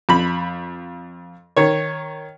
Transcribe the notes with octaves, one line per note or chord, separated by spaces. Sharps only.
F2 B5
D#3 C#5